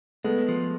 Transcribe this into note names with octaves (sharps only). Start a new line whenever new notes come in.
G#3 A3 B3
F3